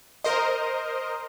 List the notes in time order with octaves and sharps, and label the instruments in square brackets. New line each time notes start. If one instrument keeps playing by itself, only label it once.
[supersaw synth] A#4 C5 D#5